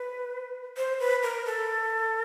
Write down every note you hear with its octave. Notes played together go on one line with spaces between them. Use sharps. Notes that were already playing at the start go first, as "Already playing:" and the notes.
Already playing: B4
C5
B4
A#4
A4